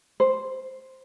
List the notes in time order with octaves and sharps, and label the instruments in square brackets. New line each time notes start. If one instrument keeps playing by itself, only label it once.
[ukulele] C5